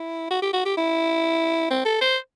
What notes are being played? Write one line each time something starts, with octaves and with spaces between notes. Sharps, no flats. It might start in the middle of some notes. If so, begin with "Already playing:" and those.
Already playing: E4
F#4
G4
F#4
G4
E4
C4
A4
C5